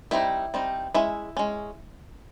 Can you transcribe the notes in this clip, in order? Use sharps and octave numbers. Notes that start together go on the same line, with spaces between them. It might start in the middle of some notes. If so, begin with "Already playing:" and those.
G3 C4 D#4 E4 E5
G3 C4 D#4
G#3 C#4 E4 E5
G#3 C#4